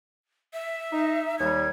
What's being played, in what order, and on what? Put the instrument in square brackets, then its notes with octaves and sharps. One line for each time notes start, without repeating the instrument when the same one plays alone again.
[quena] E5
[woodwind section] D#4
[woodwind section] D#2 G3 [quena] G#6